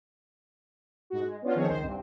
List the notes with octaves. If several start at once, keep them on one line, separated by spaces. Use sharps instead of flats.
G#2 F#4
G#3
B3 C#4 D4 F4 F#4
D#3 F3 B3 C4 G#4 C#5
C#2 D#3 C5
C2 G2 C4